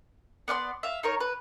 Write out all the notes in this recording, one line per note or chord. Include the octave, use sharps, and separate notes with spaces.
B3 D5 F#5 C6
E5 F5
D#4 A#4 C#5
B4